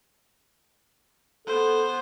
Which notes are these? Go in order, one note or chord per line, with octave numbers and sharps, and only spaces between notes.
B3 A4 C5